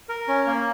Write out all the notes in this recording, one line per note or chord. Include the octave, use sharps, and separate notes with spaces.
A#4
C#4
A#3